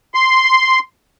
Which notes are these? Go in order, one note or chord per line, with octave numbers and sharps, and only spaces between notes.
C6